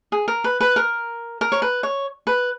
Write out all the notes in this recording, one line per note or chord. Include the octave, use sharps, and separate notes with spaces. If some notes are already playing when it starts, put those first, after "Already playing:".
G#4
A#4
B4
B4
A#4
A#4
C#5
B4
C#5
B4